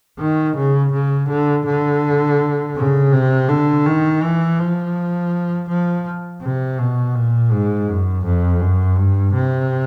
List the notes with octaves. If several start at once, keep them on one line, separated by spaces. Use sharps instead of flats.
D#3
C#3
C#3
D3
D3
C#3
C3
D3
D#3
E3
F3
F3
C3
B2
A#2
G#2
F#2
F2
F#2
G2
C3